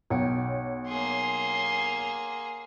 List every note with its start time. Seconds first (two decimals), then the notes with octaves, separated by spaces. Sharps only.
0.10 B1 C#5 F#5 G5
0.88 A#3 G#4 C6